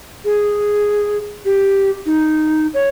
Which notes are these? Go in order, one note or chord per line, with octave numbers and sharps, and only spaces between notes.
G#4
G4
D#4
C#5